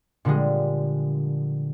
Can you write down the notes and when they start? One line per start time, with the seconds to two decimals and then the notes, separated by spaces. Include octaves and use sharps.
0.25 A#2 D3 F3 G3 G#3